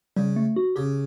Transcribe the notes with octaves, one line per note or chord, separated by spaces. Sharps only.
C#3 G3
A3
F#4
C#3 G4